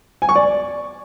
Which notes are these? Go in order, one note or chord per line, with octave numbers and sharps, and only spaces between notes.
G#5
C#6
D5